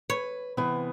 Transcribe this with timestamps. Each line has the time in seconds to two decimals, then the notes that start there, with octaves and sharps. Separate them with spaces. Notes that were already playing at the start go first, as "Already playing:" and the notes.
0.10 B4 C#5
0.57 C3 E3 B3